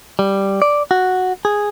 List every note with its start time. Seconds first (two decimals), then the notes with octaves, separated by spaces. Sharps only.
0.19 G3
0.62 D5
0.91 F#4
1.45 G#4